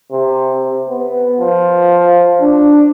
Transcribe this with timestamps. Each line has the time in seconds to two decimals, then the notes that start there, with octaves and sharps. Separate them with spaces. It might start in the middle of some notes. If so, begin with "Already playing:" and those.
0.12 C3
0.89 B3
1.40 F3
2.41 D4